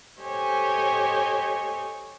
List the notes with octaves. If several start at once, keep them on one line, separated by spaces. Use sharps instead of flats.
G4 A4 C5 C#5 D#5 G#5